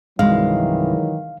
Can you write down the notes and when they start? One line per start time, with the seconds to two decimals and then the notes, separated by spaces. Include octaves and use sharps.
0.19 C2 G2 D#3 E3 F#3 G#3 F5